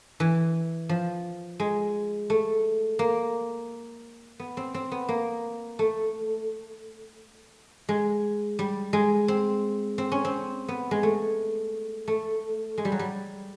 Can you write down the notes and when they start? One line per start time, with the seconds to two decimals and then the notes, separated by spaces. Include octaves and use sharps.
0.20 E3
0.89 F3
1.60 G#3
2.30 A3
2.99 A#3
4.39 B3
4.57 C4
4.74 C4
4.92 B3
5.09 A#3
5.79 A3
7.89 G#3
8.59 G3
8.93 G#3
9.28 C4
9.98 C4
10.12 C#4
10.25 C4
10.68 B3
10.91 G#3
11.03 A3
12.08 A3
12.78 G#3
12.85 G3
12.92 F#3
12.99 G3